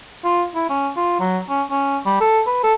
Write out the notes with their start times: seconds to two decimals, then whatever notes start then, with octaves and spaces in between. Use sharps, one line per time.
0.24 F4
0.55 E4
0.70 C#4
0.97 F4
1.20 F#3
1.49 C#4
1.71 C#4
2.06 G3
2.21 A4
2.47 B4
2.63 A4